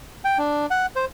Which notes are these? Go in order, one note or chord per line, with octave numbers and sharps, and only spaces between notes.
G5
D4
F#5
C5